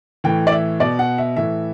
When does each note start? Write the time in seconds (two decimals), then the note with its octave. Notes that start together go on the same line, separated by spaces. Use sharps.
0.24 A2 E3 G5
0.47 D5
0.52 E5
0.80 B2 D5
0.99 F#5
1.18 E5
1.36 A2 E3 E5